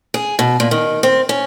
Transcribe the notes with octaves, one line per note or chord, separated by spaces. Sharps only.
G#4
B2
A#2
D#3
C4
C#4